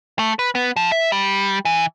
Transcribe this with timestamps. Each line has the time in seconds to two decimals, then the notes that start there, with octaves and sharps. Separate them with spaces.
0.19 A3
0.39 B4
0.55 B3
0.76 F3
0.92 E5
1.12 G3
1.65 E3